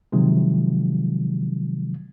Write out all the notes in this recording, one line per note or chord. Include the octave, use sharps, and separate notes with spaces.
C3 D#3 F3 F#3 G#3